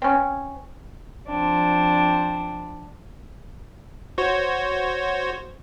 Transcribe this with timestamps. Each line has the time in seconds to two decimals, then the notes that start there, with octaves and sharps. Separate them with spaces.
0.02 C4 C#4
1.28 F3 C4 D4
4.18 F#4 C5 C#5